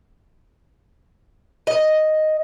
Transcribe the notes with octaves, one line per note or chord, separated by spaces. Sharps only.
D#5